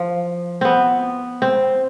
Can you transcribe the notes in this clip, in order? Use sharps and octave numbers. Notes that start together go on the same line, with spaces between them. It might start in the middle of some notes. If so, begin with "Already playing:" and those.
Already playing: F3
B3 C4
C4